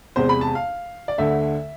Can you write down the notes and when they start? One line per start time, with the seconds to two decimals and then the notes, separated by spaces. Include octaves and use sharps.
0.16 E2 C3 G#3 C5
0.29 B5
0.41 A5
0.55 F5
1.08 D5
1.18 D2 D3 A3 E5